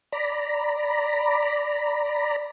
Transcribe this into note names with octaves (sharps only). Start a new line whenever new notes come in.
D5 A#5 B5